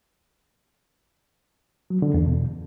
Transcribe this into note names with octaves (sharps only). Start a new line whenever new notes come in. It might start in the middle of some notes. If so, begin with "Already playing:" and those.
F#3
D3
E2
B2